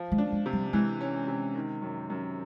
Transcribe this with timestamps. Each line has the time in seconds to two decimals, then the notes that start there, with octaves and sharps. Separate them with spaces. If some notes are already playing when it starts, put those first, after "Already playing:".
Already playing: F3
0.12 G#3
0.18 D4
0.32 G#3
0.46 C3
0.53 G3
0.73 E3 G#3
1.01 C#4
1.28 C3
1.55 D#3
1.82 F#2
2.10 F#2